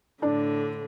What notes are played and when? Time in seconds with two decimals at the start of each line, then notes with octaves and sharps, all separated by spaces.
0.22 A2 D3 D4 D5